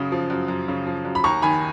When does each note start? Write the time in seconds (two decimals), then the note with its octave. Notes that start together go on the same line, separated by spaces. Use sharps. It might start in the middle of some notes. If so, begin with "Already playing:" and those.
Already playing: F#2 C#3 D#6
0.12 F3
0.30 F#2
0.48 F#2
0.68 C#3
0.87 F3
1.05 F#2
1.15 B5
1.24 D#2 A#5 C#6
1.42 D#3 G#5 B5